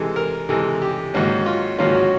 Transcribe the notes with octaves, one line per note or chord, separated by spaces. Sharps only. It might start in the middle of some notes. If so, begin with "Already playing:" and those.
Already playing: C3 E3 G#3 A4
A#4
C3 E3 G#3 A4
G4
G#2 D#3 F#3 A#3 C#4 F#4
F4
G#2 D#3 F#3 A#3 C#4 F4
F#4